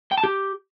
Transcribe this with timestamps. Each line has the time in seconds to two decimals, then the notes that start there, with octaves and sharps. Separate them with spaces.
0.12 G5
0.18 A5
0.24 G4